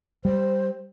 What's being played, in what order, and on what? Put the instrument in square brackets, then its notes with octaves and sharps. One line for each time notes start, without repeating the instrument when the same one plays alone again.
[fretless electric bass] G3 [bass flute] C5